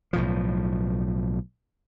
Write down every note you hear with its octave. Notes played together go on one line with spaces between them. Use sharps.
B1 A2 F3